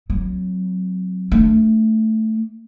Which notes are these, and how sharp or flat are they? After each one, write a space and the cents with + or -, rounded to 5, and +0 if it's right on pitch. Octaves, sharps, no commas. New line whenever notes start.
F#3 +0 C4 +0
A3 +0 D4 +0